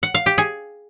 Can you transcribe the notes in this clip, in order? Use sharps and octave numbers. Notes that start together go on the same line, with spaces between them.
F#5
F5
G4
G#4